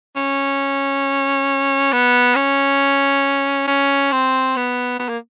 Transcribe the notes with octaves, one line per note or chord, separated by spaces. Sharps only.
C#4
B3
C#4
C#4
C4
B3
B3
A#3